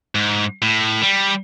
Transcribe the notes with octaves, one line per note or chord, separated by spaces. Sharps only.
G#2
A2
G3